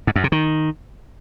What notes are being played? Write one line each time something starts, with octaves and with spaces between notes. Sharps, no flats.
G#2
F#2
C3
D#3